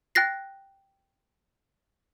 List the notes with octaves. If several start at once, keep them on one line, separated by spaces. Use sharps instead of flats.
G5 F#6 A6 A#6 C7